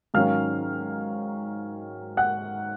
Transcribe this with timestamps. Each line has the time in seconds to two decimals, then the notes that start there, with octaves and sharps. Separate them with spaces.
0.14 G#2 D#3 F#3 C#4 F5 F6
2.17 F#5 F#6